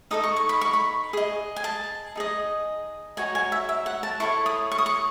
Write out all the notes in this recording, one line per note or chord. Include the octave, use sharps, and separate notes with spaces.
D#4 A4 D#5 D#6
C#6
C#6
B5
C#6
B5
G#4 D#5
G#5
A5
D#4 G#4 D#5
D#4 F#4 C#5 G#5
G#5
E5
E5
F#5
A5
E4 A4 C#5 C#6
D#6
C#6
D#6
C#6